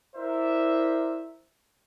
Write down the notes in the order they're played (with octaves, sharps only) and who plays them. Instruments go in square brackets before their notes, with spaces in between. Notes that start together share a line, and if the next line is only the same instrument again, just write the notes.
[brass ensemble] E4 A#4 C5 D5 E5